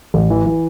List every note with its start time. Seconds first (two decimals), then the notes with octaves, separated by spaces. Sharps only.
0.14 A1
0.30 E3
0.46 E3